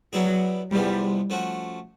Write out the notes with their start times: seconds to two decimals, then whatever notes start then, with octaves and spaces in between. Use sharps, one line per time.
0.13 F#3 G3 B3 E4 G#4
0.71 E2 C3 F3 G3 G#3 B3
1.30 F3 A3 C#4 F#4